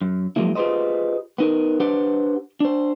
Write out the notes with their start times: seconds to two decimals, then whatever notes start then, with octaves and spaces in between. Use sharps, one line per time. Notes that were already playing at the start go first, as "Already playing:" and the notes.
0.01 F#2
0.36 F3 F#3 G#3 A#3 E4
0.55 F4 G4 G#4 B4 C5 D#5
1.38 B3 D#4 A#4
1.80 D4 G4 B4 C5 F#5
2.60 D4 C5